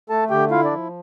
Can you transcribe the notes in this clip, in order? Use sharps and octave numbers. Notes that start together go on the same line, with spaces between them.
A3 A4 A5
D3 G4 G5
E4 F4 F5
D4 D5
F3